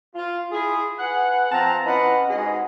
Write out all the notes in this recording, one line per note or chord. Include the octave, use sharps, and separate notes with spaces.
F4
E4 G#4
G#4 B4 F#5
F3 C4 A5 A#5
C#4 E4 B4 D#5 F#5
G#2 F#4 G#4 D#5 G#5